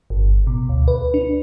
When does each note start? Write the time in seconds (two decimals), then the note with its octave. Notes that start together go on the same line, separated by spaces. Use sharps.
0.10 G1
0.47 B2
0.69 D2
0.88 B4
1.14 D4